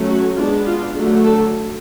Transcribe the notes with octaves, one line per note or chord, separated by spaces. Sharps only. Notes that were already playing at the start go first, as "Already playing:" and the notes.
Already playing: F#3 A3 C#4
F#4
G#3 B3 D4 F4
F4
D3 F#3 A3
A4